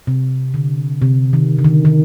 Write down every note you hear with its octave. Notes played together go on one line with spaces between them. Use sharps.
C3
D3
C3
D#3
D3
D#3
D#3